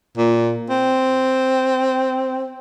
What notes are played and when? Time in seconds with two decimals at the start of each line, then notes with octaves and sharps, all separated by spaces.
0.18 A#2
0.70 C4